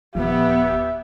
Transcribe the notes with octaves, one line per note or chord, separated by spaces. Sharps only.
D#1 F3 B3 G4 E5